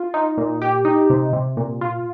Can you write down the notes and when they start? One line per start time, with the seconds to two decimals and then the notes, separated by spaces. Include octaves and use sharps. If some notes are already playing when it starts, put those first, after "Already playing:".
Already playing: F4
0.14 D#4
0.38 A#2
0.62 G4
0.85 D#4
1.10 C3
1.33 C3
1.57 A#2
1.81 F4